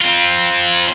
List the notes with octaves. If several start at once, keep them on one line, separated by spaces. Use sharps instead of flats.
C4 F4